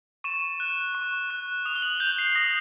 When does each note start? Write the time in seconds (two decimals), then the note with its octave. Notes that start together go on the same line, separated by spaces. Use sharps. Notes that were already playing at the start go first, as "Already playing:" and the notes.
0.24 C#6 E7
0.60 F#6
0.95 C#6
1.30 F#6
1.65 D#6 F7
1.76 G7
1.82 F#7
2.00 G6 F7
2.18 C7
2.35 D#6 A#6